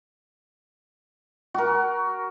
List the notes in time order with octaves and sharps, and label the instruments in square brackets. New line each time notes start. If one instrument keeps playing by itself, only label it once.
[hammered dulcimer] F#4 A#4